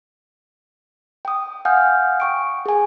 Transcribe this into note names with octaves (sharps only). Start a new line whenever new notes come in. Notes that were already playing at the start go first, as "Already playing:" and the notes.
G5 D#6
F5 F#5 G#5 D#6 F6 G6
G5 C#6 D7
G#4 G#5